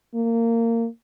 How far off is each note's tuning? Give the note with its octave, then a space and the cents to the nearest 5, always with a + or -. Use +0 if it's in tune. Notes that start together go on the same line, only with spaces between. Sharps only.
A#3 -20